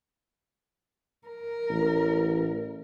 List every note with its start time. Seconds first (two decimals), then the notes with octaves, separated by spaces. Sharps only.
1.28 A#4
1.70 A1